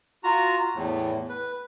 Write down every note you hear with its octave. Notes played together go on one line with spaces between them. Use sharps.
F4 F#4 A#5
E2 A2
B4